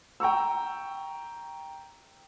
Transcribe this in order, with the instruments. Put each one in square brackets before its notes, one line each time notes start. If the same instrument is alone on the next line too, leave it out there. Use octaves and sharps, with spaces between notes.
[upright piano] G5 A#5 C#6 E6